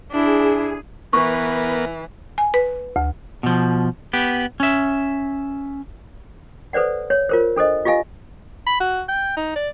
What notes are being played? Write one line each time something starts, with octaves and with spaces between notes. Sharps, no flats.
D4 E4 G#4
E3 B3 A#4 C#6
G#5
B4
D2
B2 F3
B3 G4
C#4 E5
A4 B4 C5 D5 F#5
C#5
F4 A#4 C5
D4 A4 C5 D#5
F4 G4 D#5 F5 G#5
B5
F#4
G5
D#4
D5